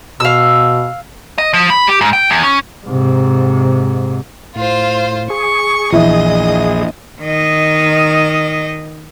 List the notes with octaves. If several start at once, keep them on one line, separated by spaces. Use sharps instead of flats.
B2 F5 E6
D#5
F3
B5
G4
G#2
G5
E2
C#4
G#2 C3
A2 F4 C5
G#4 C#6
A#1 E2 E4 D#5 E5
D#3 D#5